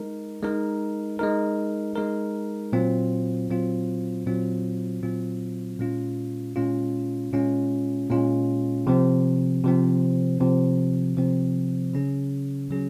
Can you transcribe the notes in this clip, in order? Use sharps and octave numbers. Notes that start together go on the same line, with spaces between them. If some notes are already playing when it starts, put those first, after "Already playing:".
Already playing: G#3 D#4 A#4
G#3 D#4 A#4
G#3 D#4 A#4
G#3 D#4 A#4
A#2 F#3 C4 F4
A#2 F#3 C4 F4
A#2 F#3 C4 F4
A#2 F#3 C4 F4
A#2 G#3 C#4 F4
A#2 G#3 C#4 F4
A#2 G#3 C#4 F4
A#2 G#3 C#4 F4
C3 F3 C4
C3 F3 C4
C3 F3 C4
C3 F3 C4
C#3 F#3 C#4 G#4
C#3 F#3 C#4 G#4